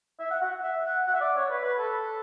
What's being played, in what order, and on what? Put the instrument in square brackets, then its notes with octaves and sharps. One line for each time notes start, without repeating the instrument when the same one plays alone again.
[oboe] E5
F#5
F#5
E5
F#5
F#5
E5
D5
C#5
B4
B4
A4